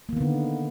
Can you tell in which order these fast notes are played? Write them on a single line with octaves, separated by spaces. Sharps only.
A#3 D#3 B3 D3